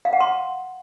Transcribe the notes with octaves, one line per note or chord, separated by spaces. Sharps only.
F5
F#5
C6